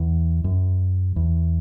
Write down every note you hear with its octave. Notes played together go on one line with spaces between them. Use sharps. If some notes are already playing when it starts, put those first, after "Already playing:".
Already playing: E2
F#2
E2